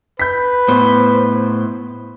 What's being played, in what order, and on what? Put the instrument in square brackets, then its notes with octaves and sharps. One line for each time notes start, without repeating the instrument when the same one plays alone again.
[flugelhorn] B4 [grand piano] G6 B6
[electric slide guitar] A2 C5 [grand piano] B3